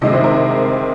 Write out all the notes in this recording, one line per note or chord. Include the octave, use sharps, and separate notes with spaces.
C2 C3 D#3 G#3 D#5
C5
A#4